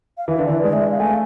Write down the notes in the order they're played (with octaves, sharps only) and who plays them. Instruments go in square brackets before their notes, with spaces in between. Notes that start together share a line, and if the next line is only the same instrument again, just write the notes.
[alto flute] F5
[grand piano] E3 [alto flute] E5
[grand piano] D3
[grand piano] E3 [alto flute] D5
[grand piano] G#3 [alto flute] D5
[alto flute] E5
D5
F5
[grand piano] A3 [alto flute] G#5